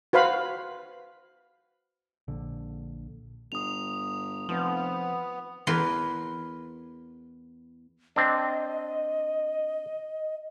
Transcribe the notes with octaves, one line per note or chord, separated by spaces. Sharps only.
F#4 B4 C5 F5 B5
A#1 D3
G1 D#6 F7
F1 F3 B3
E2 A#4 B4 C6
C4 D4 D#5